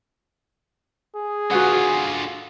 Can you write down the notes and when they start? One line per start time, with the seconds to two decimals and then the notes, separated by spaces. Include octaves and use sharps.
1.15 G#4
1.51 D3 F4 F#4 B4 F#5